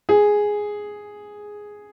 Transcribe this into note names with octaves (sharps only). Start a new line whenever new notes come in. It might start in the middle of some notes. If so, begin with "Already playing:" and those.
G#4